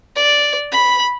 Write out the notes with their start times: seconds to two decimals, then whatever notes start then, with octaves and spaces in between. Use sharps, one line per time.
0.16 D5
0.72 B5